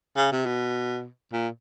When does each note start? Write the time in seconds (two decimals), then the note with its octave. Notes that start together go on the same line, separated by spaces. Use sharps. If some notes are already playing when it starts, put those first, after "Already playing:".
0.17 C#3
0.32 C3
0.46 B2
1.33 A#2